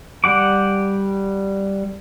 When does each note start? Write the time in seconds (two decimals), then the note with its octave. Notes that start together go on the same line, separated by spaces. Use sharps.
0.24 G3 F#5 D6